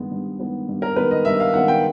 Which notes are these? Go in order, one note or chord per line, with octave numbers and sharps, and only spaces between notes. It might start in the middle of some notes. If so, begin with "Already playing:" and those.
Already playing: G2 D#3 G#3 B3
G2
D#3 G#3 B3
G2
A#4
D#3 G#3 B3 B4
D#5
G2 E5
F5
D#3 G#3 B3 F#5
G5